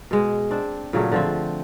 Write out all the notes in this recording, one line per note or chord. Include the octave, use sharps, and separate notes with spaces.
B2 G#3
C4 D4
A#2 C#3 F#3 A3
D3 F3 C4